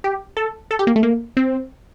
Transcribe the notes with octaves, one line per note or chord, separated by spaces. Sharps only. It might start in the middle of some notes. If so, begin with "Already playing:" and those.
G4
A4
A4
G4
A#3
A3
A#3
C4